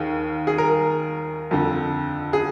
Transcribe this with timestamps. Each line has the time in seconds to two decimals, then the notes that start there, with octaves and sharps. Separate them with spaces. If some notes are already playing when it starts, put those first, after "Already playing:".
Already playing: D#2 D#3 G#4
0.47 G#4
0.58 A#4
1.51 F2 D3
2.33 G#4